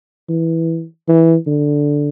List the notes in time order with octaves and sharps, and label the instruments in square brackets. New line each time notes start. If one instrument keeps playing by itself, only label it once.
[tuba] E3
E3
D3